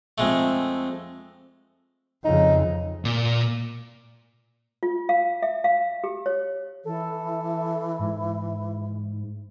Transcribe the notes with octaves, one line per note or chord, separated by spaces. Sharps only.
F2 G#3 A3
F2 C#3 D#4
A#2
F4
F5
E5
F5
G4
C#5
E3 A4
G#2